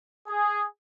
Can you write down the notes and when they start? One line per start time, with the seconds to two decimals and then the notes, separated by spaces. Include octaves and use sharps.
0.28 G#4